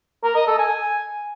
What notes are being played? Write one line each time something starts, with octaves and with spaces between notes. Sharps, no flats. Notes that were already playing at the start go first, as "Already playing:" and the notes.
A#4
D#5
A4
G#5